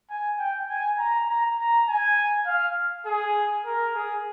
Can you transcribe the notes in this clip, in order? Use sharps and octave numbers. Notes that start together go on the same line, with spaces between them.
G#5
G5
G#5
A#5
A#5
A#5
G#5
F5
G#4
A#4
G#4